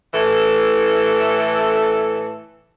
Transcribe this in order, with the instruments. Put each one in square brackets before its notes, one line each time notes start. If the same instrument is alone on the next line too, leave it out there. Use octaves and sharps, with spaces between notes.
[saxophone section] A2 E3 A4